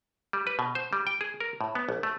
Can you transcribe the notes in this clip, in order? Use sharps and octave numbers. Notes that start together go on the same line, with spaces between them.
G3
B4
B2
C5
G3
G5
G#4
A#4
A2
B3
A#1
A3